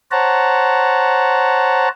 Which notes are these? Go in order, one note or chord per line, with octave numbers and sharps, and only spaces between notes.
C5 C#5 F#5 A5 A#5